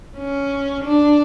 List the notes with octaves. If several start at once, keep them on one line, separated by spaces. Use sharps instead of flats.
C#4
D4